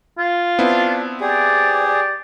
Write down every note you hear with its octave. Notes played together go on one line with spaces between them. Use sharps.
F4
B3 C4 D4 E4
G4 G#4 D5
D5